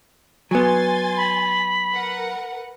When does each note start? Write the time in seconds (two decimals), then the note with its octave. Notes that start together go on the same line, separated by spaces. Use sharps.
0.51 F#3 B3 G#5 C6 A6
1.17 B5
1.92 A#4 B4 F#5